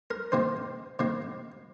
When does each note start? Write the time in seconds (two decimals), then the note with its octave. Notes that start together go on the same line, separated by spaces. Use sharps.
0.11 A#4
0.32 C3 D#3 A#3 C5
0.99 C3 D#3 A#3